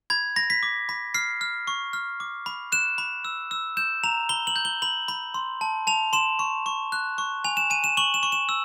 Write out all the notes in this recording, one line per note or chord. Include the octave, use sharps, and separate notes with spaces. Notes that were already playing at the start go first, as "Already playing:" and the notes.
B5 G#6
B5 A#6
B6
D6
B5
F6 C7
F6
C#6
F6
D6
B5
F#6 E7
B5
E6
E6
G6 E7
A#5 F7
B5 G7
F#7
G6
G7
B5 F#7
B5
C6
A5
A5 F7
C6 E7
C#6
C#6
F#6
C#6
G#5 F7
E7
G#5 D#7
E7
C#6 F#7
E7
C#6
E7
E6